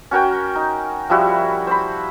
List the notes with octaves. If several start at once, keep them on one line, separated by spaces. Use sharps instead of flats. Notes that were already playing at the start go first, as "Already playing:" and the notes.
C#4 F#4 A#4 G5
D#4
F3 G3 E4 F#4
C5 B5